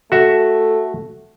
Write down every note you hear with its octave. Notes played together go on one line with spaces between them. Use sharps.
A3 F#4 E5